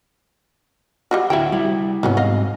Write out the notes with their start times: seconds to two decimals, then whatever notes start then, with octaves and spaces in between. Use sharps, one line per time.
1.11 G3 F4 F#4
1.30 D2 E4 F#4 E5 G5
1.52 G3 E4
2.03 G#2 C3 F#3 B3 C#4
2.17 D#5 F5